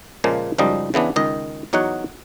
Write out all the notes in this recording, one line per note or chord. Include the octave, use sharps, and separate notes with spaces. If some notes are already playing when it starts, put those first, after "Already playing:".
A#2 C#3 F3 G#3 A#3
C#2 F#2 F3 G3 D#4 D#5
C#3 E3 B3 D4
C#2 D#3 D#5
E2 F#3 D#4 C#5 F#5